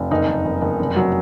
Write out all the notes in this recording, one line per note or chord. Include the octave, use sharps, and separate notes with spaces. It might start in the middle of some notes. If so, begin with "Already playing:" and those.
Already playing: F1
F#1 D#4
F#1
F#1
F#1
F1
F#3